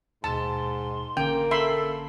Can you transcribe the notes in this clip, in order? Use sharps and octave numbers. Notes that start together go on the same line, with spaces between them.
D#2 G#2 B2 A5 C6
A1 D3 A#3 C#4 G5
A4 E5 B5 C6